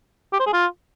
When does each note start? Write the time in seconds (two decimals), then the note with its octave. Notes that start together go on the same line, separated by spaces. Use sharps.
0.33 G4
0.40 C5
0.46 G#4
0.53 F4